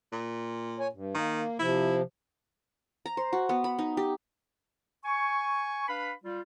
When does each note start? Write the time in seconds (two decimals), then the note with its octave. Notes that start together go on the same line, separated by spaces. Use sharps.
0.13 A#2
0.79 C#5 G#5
0.93 G2
1.15 D#3 A#3
1.59 C3 F3 E4
3.06 A#5
3.17 C5
3.33 F#4
3.49 B3
3.64 B5
3.79 D#4
3.97 G4
5.04 G#5 C#6
5.88 D4 B4 F5 B5
6.23 G3 F4